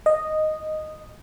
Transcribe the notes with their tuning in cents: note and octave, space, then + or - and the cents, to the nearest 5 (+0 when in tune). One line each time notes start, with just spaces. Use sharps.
D#5 -5